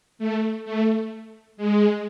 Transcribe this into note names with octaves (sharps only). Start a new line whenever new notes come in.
A3
A3
G#3